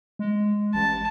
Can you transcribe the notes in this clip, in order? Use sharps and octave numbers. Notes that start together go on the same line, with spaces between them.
G#3
A1 A5